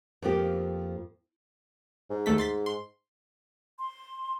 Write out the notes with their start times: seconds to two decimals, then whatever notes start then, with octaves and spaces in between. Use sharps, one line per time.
0.22 F2 F3 A#3 G4
2.10 G#2
2.26 D#2 A3 B6
2.38 C6 A6 B6
2.66 C6
3.79 C6